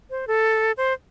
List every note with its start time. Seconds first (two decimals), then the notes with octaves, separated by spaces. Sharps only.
0.10 C5
0.27 A4
0.77 C5